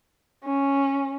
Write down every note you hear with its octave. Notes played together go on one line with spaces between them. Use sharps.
C#4